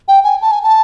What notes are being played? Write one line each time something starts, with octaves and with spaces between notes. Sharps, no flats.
G5
G#5
A5
G#5
A5